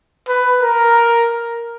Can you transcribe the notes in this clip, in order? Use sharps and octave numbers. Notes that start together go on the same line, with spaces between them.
B4
A#4